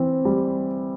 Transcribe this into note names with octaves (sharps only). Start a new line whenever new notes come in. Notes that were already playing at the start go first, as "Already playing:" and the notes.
Already playing: E3 C4
G3